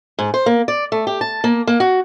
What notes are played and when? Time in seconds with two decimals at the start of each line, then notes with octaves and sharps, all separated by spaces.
0.19 G#2
0.34 C5
0.46 A#3
0.68 D5
0.92 A3
1.07 G4
1.21 A5
1.44 A#3
1.67 A#3
1.80 F#4